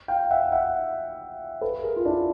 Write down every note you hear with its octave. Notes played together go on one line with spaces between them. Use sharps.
F5 G5
E5 F#5
E5 F#5
A4 B4
G#4 A#4
F4
D4 E4